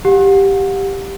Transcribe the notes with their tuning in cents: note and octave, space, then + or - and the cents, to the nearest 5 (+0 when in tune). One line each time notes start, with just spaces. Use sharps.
G4 +0 F#5 -35